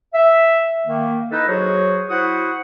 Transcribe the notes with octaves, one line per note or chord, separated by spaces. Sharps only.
E5
D#3 A#3
D#4 E4 A4 B4 D#5
F#3 F#4 G#4 C5 C#5
E4 F#4 C5 F#5 D#6